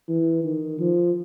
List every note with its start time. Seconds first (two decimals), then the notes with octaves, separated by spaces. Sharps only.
0.09 E3
0.44 D#3
0.79 F3